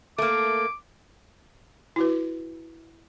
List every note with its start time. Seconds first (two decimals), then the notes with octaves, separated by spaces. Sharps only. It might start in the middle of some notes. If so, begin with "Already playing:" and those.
0.18 A3 A#3 D6
1.96 E4 F#4 B4